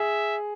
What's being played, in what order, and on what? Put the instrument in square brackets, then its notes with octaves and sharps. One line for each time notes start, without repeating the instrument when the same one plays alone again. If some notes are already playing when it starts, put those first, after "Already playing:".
Already playing: [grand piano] G#4 [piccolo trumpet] E5